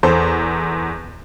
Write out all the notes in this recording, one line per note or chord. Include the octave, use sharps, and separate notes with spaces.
E2 A4 C5